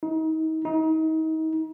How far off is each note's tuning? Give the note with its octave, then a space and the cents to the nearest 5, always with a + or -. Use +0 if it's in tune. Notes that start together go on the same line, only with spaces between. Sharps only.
D#4 +35
D#4 +35